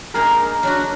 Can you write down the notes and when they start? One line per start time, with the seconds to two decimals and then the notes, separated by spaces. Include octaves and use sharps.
0.14 A#3 D#4 G#4 A#4 D5
0.63 F#3 D4 F#4